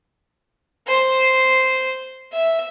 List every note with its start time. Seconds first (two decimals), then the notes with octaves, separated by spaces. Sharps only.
0.87 C5
2.31 E5